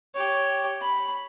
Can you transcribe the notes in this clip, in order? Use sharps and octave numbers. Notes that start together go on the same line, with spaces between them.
G4 C#5
B5